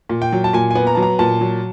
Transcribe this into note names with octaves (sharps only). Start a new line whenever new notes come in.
A#2
G5
F#3
A5
A#2 G#5
B3 G#5
A#5
F#3 A5
A#5
A#2 A5
F#3